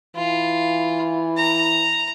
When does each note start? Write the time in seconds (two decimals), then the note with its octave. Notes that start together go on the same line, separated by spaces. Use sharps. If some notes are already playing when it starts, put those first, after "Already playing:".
0.15 E3 F4
1.37 A#5